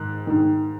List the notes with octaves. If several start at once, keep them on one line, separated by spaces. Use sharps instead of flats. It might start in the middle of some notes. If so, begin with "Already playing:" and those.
Already playing: G#2 D#3 F#6
G#2 D#3